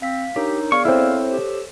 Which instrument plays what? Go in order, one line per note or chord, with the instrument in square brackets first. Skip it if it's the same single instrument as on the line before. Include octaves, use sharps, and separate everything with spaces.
[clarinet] C4 [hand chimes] F5 B6
[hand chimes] D4 A#4 C#5 [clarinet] D#4 [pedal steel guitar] G4
[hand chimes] B3 G#4 D5 [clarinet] F5 [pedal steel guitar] C#6
[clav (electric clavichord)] C4 E4 [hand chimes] A4 C5 C#5 [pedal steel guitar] E6
[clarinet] G4